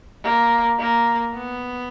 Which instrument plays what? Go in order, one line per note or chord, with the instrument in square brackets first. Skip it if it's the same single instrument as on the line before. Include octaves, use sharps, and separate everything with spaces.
[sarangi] A#3
A#3
B3